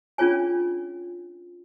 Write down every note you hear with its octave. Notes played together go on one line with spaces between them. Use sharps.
C#4 D4 F4 G#4 C#5 G#5